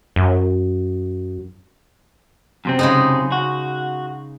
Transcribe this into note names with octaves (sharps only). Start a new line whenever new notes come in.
F#2
F#2 C3 C4
C#3 G#3 D#4
F#4